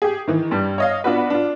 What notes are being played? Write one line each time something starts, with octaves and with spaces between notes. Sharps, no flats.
G4 G#4
D#3 E3
G2 G3
C#5 D#5 F5
B3 D4 F4 F#4 B4
D4 F4